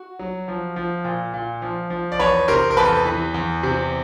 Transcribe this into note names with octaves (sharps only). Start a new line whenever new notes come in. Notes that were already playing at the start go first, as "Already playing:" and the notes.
Already playing: F#4
F#3
F3
F3
A#2
A#2
F3
F3
D5
E2 B4 C#5
C3 A#4 C5
A#4
E2 A4 B4
E3
E2
C3